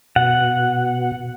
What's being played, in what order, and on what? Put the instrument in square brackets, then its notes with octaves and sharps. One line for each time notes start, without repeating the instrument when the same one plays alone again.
[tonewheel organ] B2 [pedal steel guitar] F#5